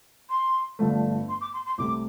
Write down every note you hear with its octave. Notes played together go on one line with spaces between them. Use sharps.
C6
G1 G2 D3 F3 A3
C6
D6
C6
C6
C2 C3 A3 D6